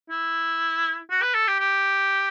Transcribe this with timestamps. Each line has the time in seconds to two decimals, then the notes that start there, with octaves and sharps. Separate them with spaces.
0.10 E4
1.10 F#4
1.22 B4
1.35 A4
1.47 G4
1.60 G4